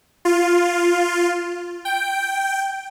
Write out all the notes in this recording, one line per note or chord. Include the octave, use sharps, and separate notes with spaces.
F4
G5